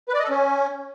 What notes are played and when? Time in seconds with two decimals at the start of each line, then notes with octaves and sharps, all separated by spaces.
0.09 B4
0.14 D5
0.19 D#5
0.24 A4
0.30 C#4